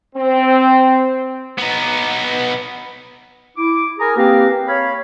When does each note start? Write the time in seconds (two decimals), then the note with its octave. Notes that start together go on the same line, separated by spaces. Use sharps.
0.16 C4
1.58 B3 D#4
3.56 E4 D6
3.99 G#4 A#4 G#5 A#5
4.16 A#3 C4 G4 B4 F5 A#5
4.67 C#5 F5 B5